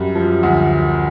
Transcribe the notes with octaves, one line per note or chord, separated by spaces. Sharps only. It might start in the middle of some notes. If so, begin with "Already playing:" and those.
Already playing: F#2 G3
F3
D2